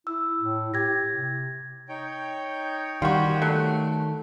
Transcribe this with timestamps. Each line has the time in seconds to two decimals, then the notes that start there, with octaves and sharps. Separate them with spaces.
0.07 E4 E6
0.40 A2
0.74 G4 G#6 A#6
1.12 C3
1.89 D#4 C#5 G5
3.02 D#3 G3 F4 F#4
3.42 F#3 A3